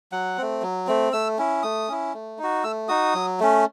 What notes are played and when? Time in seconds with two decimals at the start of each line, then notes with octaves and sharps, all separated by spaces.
0.12 F#3 F#5
0.38 A3 C4
0.62 F#3
0.87 A3 C4
1.13 A3 E6
1.38 C#4 E4
1.63 A3 D#6
1.88 C#4 E4
2.14 A3
2.38 D#4 F#4
2.64 A3 E6
2.88 D#4 F#4 D#6
3.15 F#3
3.40 A3 C#4